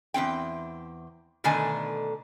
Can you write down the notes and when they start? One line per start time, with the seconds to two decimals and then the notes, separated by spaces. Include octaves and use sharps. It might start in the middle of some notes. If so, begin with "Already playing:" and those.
0.14 E2 G#2 C4 G5
1.44 B2 D3 D#3 A3 D4 G#5